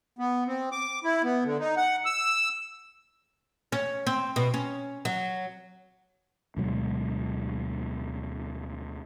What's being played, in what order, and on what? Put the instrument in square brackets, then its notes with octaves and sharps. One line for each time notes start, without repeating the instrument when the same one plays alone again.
[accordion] B3
C4
D6
E4
B3
D3
D#4
F#5
E6
[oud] C#4
C4
B2
C#4
F#3
[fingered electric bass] D2 B2 F#3 G#3